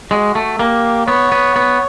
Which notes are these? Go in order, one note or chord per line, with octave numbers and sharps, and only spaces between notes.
G#3 F#4
A3
A#3 G4
B3 C#5
B3
B3